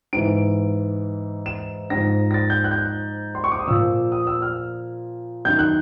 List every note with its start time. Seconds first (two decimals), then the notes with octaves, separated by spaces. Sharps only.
0.13 G#2 E3 D7
1.46 E7
1.90 G#2 F3 A#6
2.31 A#6
2.34 A6
2.50 G6
2.64 F#6
2.71 G6
2.78 F#6
3.35 C6
3.44 C#6
3.52 D6
3.59 D#6
3.68 A#2 F3 E6
4.12 D#6
4.27 E6
4.42 F6
5.45 F#2 D#3 G6
5.59 F#6